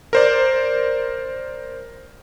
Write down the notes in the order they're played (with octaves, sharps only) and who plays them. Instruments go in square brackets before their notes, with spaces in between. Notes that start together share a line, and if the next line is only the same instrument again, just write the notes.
[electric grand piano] A#4 C5 D5